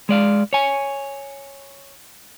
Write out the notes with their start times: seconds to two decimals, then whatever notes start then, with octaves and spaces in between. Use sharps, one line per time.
0.09 G#3 D5 F5
0.53 C#5 G#5